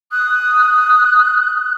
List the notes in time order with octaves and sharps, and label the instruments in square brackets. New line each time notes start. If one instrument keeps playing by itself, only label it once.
[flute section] D#6 [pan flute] F#6